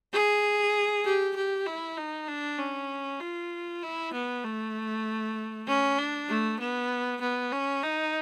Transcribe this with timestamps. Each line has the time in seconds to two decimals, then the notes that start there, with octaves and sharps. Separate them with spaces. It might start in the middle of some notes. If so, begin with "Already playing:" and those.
0.13 G#4
1.05 G4
1.36 G4
1.66 E4
1.97 D#4
2.28 D4
2.59 C#4
3.20 F4
3.83 E4
4.13 B3
4.44 A3
5.68 C#4
5.99 D4
6.29 A3
6.60 B3
7.21 B3
7.52 C#4
7.83 D#4